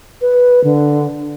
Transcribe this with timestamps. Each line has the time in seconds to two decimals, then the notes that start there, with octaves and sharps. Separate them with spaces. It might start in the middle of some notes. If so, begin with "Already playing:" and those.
0.21 B4
0.64 D3